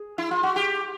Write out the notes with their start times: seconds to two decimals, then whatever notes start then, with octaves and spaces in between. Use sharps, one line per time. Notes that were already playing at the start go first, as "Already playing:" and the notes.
Already playing: G#4
0.18 E4
0.31 F4
0.43 F#4
0.56 G4